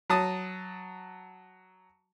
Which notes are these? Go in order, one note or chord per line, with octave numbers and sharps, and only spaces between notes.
F#3 A5 D#6